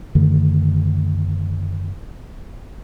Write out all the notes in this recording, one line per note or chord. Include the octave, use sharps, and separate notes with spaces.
F#2 D3 D#3 A3